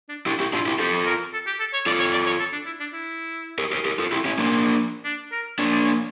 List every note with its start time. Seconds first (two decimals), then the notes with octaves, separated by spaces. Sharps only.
0.09 D4
0.26 D4 E4 G4
0.40 E4 G4
0.53 D4 E4 F4
0.66 E4 G4
0.79 F4 G4 A4
1.06 A#4
1.33 A4
1.47 G4
1.60 A4
1.73 C#5
1.86 F4 A4 D5
1.99 C#5
2.13 D5
2.26 C#5
2.40 A4
2.53 D4
2.66 E4
2.80 D4
2.93 E4
3.58 G4 A#4
3.72 G4 A#4
3.85 G4 A#4
3.99 F4 A4
4.12 E4 G4
4.25 C#4 E4
4.38 A#3 D4
5.05 D4
5.32 A#4
5.58 A#3 D4 C#5
5.72 D5
5.85 C#5